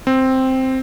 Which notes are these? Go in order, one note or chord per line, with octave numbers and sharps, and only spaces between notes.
C4